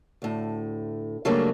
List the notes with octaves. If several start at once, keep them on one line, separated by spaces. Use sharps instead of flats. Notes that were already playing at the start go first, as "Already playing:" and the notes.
D2 A2
C#3 F#3 G3 A3 A#3 D4